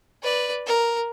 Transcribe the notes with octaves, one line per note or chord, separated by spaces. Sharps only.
B4 D5
A#4